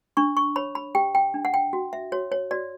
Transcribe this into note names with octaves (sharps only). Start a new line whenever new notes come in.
D4 C#6
C#6
C#5 B5
B5
G4 G5
G5
D4
F#5
G5
F#4
E5
F#4 C#5
C#5
F#4 D5